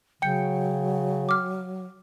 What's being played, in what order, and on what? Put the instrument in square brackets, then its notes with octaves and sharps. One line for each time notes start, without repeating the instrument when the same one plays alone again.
[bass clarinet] C#3 [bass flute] F#3 [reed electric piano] G5 [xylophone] G6 C#7
[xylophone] D6 F6